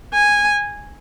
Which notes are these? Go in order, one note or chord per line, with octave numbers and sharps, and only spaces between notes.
G#5